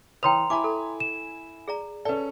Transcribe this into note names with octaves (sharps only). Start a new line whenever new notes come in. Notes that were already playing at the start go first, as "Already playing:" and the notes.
E3 B4 C#5 G5 A#5 C6 D#6 F7
E4 G#5 B5 D6
A4
E7
G#4 D5 A#5
C#4 A4 B4 D5